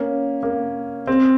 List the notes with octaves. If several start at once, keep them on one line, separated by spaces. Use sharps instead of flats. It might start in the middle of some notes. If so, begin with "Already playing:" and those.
Already playing: A#3 C#4
A#3
C4